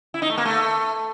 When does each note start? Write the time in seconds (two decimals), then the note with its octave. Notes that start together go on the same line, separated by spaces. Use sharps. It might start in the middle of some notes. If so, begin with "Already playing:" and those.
0.14 E4
0.22 D#4
0.30 A3
0.38 A#3
0.45 A3